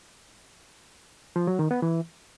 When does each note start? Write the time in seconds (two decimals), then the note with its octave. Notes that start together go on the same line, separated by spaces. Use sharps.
1.36 F3
1.47 F#3
1.59 D#3
1.71 B3
1.82 E3